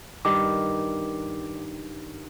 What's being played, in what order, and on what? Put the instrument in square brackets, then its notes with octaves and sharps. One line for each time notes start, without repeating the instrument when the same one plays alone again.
[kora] G2 D#3 [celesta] D6